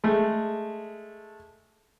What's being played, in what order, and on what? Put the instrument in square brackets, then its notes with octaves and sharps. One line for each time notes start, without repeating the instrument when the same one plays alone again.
[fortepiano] G#3 A3